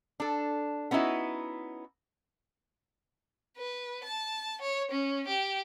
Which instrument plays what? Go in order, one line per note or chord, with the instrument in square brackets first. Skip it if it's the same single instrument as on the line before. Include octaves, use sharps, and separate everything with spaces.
[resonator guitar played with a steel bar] D4 A4
B3 C#4 D#4 E4 F#4
[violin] B4
A5
C#5
C#4
G4